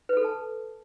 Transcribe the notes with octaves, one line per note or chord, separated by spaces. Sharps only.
B4
A4
A5